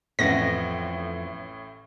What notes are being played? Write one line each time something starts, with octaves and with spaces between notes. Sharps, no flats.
A1 F2 A2 B3 D#5 A#6